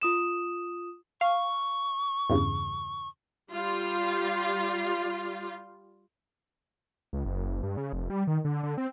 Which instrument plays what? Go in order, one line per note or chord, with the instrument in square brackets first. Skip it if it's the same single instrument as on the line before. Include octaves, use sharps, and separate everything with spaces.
[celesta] F4 D#6 E7
[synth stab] F5 [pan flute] C#6
[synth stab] E2 G2 C#3
[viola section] G3 F4
[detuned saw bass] C#2
F#1
G2
C#3
F1
G3
D#3
D3
D3
C4